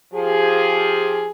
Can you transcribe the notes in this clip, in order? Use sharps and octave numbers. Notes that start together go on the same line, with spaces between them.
F3 G4 G#4